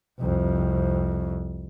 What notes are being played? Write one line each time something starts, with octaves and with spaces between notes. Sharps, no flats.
C2 F2